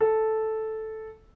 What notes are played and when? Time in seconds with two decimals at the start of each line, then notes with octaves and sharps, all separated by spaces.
0.01 A4